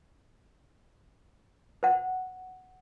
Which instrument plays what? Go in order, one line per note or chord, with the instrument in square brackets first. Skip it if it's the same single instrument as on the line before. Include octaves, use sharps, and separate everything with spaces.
[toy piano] C5 F#5